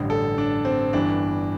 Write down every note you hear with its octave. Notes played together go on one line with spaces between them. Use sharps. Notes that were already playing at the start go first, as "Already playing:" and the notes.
Already playing: A1 G2 D3
A4
D4
C4
G1 G2 E3 D4